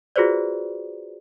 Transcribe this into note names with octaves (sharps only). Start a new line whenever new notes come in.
F4 F#4 G#4 B4 C5 D5